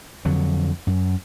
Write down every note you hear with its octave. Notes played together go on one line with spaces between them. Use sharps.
F2 D3 F#3
F#2